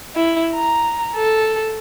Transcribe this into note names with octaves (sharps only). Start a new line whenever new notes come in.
E4
A#5
A4